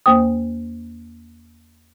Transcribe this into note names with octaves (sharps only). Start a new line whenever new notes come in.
E2 A#3 C5 G5 D#6